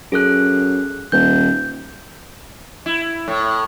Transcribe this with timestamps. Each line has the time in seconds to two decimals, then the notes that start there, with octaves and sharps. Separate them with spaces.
0.12 F#2 G#4 A4 F#6
1.12 D#1 G6
2.86 E4
3.28 A2